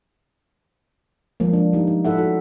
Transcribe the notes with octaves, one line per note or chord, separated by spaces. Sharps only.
F3 G#3 A#3
D4
G3 D#4
D#4
E4 A4 E5 F#5
D#4 F#4 A4